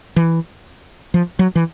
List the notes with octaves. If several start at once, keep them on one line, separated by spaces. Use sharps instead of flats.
E3
F3
F#3
E3